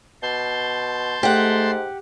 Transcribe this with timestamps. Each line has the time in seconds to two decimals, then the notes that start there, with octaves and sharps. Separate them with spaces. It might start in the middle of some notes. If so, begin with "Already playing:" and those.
0.23 B2 A5 C6 G6
1.23 G#2 A3 G4 F#5